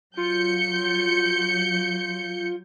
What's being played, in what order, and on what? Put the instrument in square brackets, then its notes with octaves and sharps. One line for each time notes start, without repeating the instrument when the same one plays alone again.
[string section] F#3 G6 C#7 [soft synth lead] F4